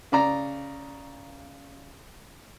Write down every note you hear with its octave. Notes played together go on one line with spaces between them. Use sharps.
C#3 D5 A#5